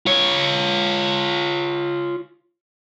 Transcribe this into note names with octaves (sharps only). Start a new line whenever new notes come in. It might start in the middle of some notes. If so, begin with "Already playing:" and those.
F4 C#5